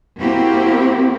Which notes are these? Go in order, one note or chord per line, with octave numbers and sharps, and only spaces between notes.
A#3 C4 E4 F#4 G4